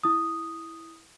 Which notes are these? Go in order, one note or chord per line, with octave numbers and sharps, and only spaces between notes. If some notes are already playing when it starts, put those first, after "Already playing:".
E4 D#6